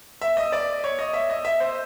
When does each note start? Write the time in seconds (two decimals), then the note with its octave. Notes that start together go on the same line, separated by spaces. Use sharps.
0.21 E5
0.37 D#5
0.52 D5
0.84 C#5
0.99 D#5
1.13 E5
1.30 D#5
1.45 E5
1.60 C5